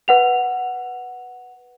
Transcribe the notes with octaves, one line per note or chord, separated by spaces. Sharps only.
B4 F#5 F7